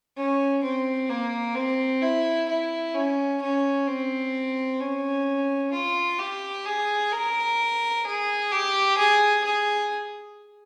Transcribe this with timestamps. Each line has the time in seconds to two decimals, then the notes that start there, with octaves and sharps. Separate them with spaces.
0.17 C#4
0.63 C4
1.09 A#3
1.55 C4
2.02 E4
2.49 E4
2.95 C#4
3.42 C#4
3.87 C4
4.80 C#4
5.73 F4
6.19 G4
6.66 G#4
7.12 A#4
8.05 G#4
8.52 G4
8.98 G#4
9.44 G#4